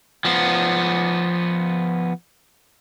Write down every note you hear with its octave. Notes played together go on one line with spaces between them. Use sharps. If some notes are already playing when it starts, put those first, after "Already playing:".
F3 B3